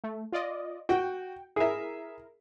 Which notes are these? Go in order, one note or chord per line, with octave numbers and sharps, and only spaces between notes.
A3
F4 D5 D#5
F#4 G5
E4 G#4 A#4 E5